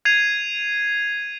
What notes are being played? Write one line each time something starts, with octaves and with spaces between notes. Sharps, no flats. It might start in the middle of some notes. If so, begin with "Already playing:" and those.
G#6 C7 D#7 F7